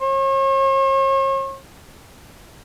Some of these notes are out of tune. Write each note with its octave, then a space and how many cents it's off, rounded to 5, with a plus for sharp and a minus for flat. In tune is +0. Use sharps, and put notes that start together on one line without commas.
C#5 -40